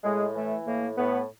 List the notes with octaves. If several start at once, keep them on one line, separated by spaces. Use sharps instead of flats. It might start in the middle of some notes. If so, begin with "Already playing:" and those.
A2 G#3
E3 A3
A2 A#3
A2 B3